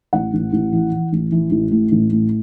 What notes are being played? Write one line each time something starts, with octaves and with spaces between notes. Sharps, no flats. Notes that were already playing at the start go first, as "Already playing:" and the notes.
A1 F#5
A1
A1
E3
E3
A1
E3
A1
A2
A1
A2